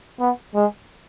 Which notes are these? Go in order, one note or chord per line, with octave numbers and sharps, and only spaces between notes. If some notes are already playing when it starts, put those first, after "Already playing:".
B3
G#3